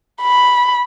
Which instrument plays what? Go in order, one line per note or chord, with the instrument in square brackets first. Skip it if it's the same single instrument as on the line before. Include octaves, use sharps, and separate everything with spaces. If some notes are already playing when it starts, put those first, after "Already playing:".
[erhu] B5